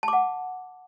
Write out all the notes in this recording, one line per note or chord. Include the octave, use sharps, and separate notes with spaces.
F#5 A5 D6